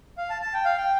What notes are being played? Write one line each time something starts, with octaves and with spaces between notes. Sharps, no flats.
F5
A5
A5
G5
F5
G5